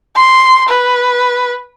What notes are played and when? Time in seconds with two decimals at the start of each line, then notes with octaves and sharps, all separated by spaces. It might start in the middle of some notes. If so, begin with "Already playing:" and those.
0.16 C6
0.69 B4